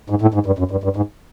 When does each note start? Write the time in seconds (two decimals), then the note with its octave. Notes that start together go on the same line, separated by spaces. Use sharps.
0.10 G#2
0.22 A2
0.34 G#2
0.46 G2
0.59 F#2
0.71 G2
0.84 G2
0.96 G#2